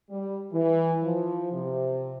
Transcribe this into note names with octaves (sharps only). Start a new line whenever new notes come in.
G3
E3
F3
C3